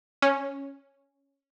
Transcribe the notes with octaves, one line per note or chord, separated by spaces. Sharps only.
C#4